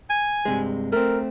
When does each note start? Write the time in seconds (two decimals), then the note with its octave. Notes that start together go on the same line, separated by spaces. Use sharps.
0.10 G#5
0.45 G2 C3 G#3
0.92 A3 C4 A#4